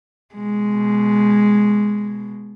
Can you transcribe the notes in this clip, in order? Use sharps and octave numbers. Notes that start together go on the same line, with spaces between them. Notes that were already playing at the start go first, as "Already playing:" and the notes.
B2 G#3